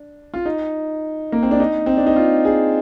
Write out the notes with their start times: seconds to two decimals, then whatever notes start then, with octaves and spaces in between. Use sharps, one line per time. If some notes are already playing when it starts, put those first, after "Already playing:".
Already playing: D4
0.34 F4
0.46 D#4
1.32 A#3
1.43 C4
1.51 D4
1.60 D#4
1.86 C4
1.97 D4
2.06 D#4
2.16 F4
2.45 G#4